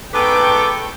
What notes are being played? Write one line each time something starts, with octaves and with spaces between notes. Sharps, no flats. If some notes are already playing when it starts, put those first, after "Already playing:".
G#2 B3 A4 B4 G5 C#6 D6